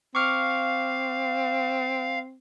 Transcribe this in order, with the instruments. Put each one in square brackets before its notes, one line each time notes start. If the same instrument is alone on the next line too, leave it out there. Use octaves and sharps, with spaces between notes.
[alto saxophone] C4 [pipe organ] F5 [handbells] C#6 D6 F6